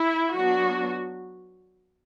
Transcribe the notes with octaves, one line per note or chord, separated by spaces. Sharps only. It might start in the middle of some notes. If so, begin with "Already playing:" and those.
Already playing: E4
F#3 B3 D4 F#4